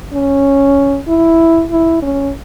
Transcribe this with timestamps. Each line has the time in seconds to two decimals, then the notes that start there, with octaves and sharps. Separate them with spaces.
0.13 C#4
1.08 E4
1.71 E4
2.03 C#4